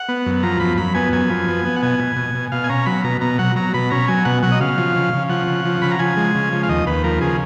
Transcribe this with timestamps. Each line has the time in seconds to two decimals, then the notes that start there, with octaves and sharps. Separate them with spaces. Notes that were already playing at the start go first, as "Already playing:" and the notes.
Already playing: F#5
0.08 B3
0.26 F#2
0.43 F3 A#5
0.60 F#2 B5
0.77 F#2 B5
0.94 B3 G#5
1.12 F#2 G#5
1.29 F3
1.48 B3
1.65 B3
1.76 F#5
1.82 B2 G#5
1.99 B2
2.16 B2
2.34 B2
2.52 B2 F5
2.64 G#5
2.69 C#4 A#5
2.86 F#3 B5
3.04 B2 A#5
3.21 B2 A#5
3.39 F#3 F#5
3.56 F#3 A#5
3.74 B2 B5
3.90 C#4 A#5
4.08 F#3 G#5
4.25 B2 F#5
4.43 F#3 F#5
4.52 D#5
4.61 C#3 F5
4.78 F3
4.96 C#3
5.13 C#3
5.29 F3 F#5
5.47 C#3
5.65 F3
5.82 C#3 B5
5.91 A#5
5.99 F3 G#5
6.17 G#3
6.35 C#3
6.52 F3
6.63 F5
6.69 D#2 D#5
6.86 D#2 B4
7.04 F3 A#4
7.21 C#3 G#4